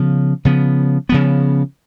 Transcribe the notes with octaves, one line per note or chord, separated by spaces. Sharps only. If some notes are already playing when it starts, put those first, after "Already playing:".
Already playing: C#3 F3 B3
C#3 F3 B3
C#3 F3 B3